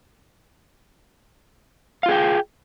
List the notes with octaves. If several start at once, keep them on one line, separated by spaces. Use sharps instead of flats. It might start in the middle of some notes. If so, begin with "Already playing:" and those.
F4 G#4 F5 G5